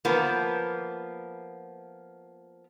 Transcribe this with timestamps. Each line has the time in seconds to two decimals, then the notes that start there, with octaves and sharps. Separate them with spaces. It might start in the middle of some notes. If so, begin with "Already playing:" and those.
0.05 F3 A#3 B3